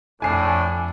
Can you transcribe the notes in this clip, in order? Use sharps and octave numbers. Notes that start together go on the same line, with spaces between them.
F2 A2 D4 G#5 C7